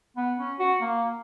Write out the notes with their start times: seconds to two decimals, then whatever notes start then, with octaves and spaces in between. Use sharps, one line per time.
0.17 B3
0.38 C#4
0.59 F#4
0.81 A#3